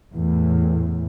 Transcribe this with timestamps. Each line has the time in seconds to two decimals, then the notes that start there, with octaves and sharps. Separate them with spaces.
0.15 E2 A2